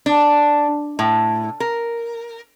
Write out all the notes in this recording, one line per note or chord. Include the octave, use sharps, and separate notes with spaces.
D4
A2
A#4